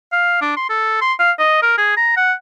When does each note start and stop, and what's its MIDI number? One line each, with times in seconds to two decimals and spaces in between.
0.12 0.38 77
0.41 0.53 62
0.57 0.67 84
0.69 0.99 69
1.01 1.13 84
1.19 1.31 77
1.39 1.60 75
1.62 1.75 70
1.77 1.96 68
1.97 2.12 82
2.17 2.33 78